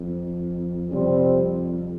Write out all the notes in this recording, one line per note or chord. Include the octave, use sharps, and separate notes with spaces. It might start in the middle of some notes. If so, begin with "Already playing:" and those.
Already playing: F2
F2 C3 G3 C4